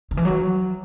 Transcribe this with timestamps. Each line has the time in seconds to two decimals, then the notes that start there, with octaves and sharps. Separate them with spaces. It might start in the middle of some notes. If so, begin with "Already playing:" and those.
0.11 D3
0.17 E3
0.25 F#3